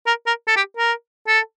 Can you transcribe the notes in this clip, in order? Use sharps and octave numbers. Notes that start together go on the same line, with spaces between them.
A#4
A#4
A4
G4
A#4
A4